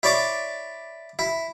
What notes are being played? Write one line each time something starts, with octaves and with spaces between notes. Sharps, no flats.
E4 C#5 D5 C6 D6
E4